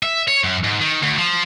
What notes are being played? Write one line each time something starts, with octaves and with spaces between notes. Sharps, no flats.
E5
C#5
F#2
G#2
D#3
D2
F3